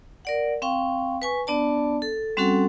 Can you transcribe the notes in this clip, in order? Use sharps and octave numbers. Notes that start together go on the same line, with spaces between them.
A#4 D5 F#5
C4 F5 G5 C#6
B4 G#5 C#6
B3 D4 D5 A5
A4
G3 C4 C#4 F#4 A4 F#5